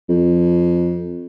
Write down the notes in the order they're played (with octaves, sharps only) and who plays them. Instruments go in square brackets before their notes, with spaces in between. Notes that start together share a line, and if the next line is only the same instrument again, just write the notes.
[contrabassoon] F2